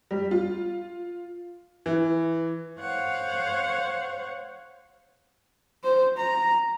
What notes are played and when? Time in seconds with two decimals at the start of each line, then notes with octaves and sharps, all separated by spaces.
0.11 G3
0.31 F4
1.86 E3
2.80 C5 C#5 F5 F#5
5.83 C5
6.17 A#5